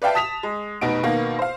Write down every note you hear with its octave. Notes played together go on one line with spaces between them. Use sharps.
B4 D5 E5 F5 G5 A5
A5 D#6 B6 E7 F7
G#3
F1 B2 B3 D#4 D7
B2 D#3 A#3 B3
C5 F5